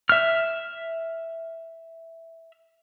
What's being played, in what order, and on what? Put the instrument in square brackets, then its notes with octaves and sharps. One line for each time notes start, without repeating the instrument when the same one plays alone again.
[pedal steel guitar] E5 F6